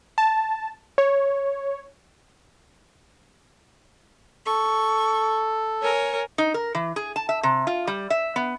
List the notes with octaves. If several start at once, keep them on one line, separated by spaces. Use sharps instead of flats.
A5
C#5
A4 C#6
A#4 C#5 G#5
D#4
A#4
E3
G#4
A5
E5
C3
F4
G3
E5
B3